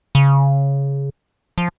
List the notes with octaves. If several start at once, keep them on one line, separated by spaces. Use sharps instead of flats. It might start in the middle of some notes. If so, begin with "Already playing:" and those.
C#3
F3